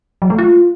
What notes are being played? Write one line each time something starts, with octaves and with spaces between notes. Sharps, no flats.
F#3
A3
F4